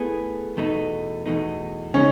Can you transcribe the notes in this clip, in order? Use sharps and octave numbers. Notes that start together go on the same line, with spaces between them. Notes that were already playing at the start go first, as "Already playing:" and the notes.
Already playing: A3 B3 E4 G#4
E2 B2 A3 D#4
E2 B2 A3 D#4
C#3 G#3 C#4 D#4